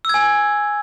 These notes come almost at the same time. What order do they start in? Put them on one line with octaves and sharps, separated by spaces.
E6 G#6 G#5